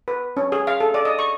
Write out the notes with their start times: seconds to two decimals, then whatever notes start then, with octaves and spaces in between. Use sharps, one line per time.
0.08 B4
0.37 C#4
0.52 G#4
0.67 F5
0.80 A4
0.94 D5
1.05 D#5
1.19 C#6